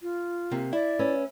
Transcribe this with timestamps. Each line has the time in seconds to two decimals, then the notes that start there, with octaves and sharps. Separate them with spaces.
0.02 F4
0.51 C3 A#3
0.73 E4 D5
0.99 C#4 B4 E5